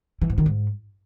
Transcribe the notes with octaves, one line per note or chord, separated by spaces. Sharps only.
E3
G#2
D#3
G#2